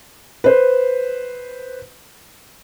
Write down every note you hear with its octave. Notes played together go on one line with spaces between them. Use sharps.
B4 C5